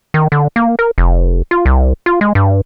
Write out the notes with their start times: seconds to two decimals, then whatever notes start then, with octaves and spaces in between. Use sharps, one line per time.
0.14 D#3
0.32 D3
0.56 A#3
0.79 A#4
0.98 F1
1.51 F4
1.66 C2
2.06 F4
2.21 G#3
2.35 G2